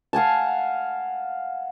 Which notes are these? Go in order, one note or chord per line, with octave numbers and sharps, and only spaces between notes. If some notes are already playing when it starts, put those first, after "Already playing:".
F5 F#5 G#5 A5